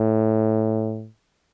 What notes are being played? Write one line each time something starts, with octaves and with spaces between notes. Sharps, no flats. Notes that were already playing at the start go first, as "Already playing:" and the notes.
Already playing: A2